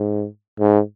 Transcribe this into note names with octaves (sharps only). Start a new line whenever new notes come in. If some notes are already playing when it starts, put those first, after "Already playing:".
Already playing: G#2
G#2